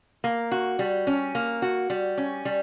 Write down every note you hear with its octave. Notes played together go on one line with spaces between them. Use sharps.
A#3
F#4
G3
C#4
A#3
F#4
G3
C#4
G3